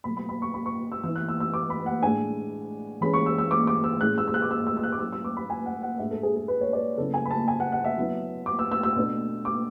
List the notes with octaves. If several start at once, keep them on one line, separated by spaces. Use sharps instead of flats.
B2 F#3 A3 B5
B5
B5
C#6
B5
C#6
E6
E3 B3 E4 E6
F#6
E6
E6
D6
B5
F#5
A2 G#3 D4 G#5
E3 G#3 C#4 B5
C#6
E6
E6
D6
D6
E6
A2 G#3 C#4 E4 F#6
E6
E6
F#6
D6
E6
E6
E6
F#6
D6
F#3 C#4 E4 E6
E6
D6
B5
G#5
F#5
F#5
A2 G#3 D4 E5
A4
G#4
G#4
B4
C#5
D5
C#3 F#3 B3 E4 A4
G#5
B5
A5
G#5
F#5
F#5
E5
F#3 B3 E4
D6
E6
E6
E6
B2 A3 D4
D6